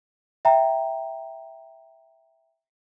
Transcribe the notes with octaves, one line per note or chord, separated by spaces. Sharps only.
E5 G5 A#5